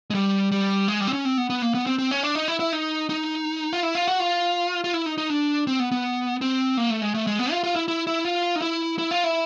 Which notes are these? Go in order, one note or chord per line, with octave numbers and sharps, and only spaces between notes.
G#3
G3
G3
G#3
G3
C4
C#4
C4
B3
B3
A#3
B3
C4
C4
C#4
D4
D#4
E4
E4
D#4
D#4
F4
E4
F4
F#4
F4
F4
E4
D#4
D#4
D4
C4
B3
B3
C4
A#3
A3
G#3
A3
G#3
B3
F4
F4
E4
E4
E4
F4
D#4
E4
E4
F4
E4